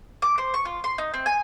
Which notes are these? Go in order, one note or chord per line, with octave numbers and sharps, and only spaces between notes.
D6
C5
C#6
F4
C6
D#4
C4
G#5